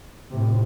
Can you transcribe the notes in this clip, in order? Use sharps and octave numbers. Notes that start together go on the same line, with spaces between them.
A2 C3